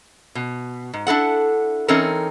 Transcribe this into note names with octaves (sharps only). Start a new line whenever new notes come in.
B2
G#2
D4 E4 A4 F#5
E3 C4 C#4 D#4 A4 A#4